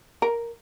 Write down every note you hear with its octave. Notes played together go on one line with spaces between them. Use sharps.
A#4